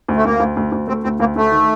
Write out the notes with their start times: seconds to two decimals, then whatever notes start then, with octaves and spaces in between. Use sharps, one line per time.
0.08 D2
0.16 A3
0.25 D2 A#3
0.40 D2
0.57 D2
0.72 D2
0.88 A3 C4
1.04 D2 C4
1.20 D2 A#3
1.36 D2 A3
1.51 D#3